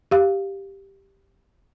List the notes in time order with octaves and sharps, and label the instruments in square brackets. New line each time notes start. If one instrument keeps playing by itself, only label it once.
[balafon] G4 F5